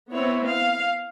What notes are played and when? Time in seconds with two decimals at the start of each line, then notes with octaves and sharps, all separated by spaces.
0.14 B3 C4 E4 C#5
0.50 F5